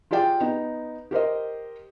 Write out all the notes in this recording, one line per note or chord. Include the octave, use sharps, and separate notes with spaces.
F4 G4 G#4 D5 G5
B3 D#4
G4 A#4 C5 D#5